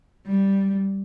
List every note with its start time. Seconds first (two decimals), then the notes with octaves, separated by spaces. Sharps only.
0.27 G3